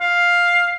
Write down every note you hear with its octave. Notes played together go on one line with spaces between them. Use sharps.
F5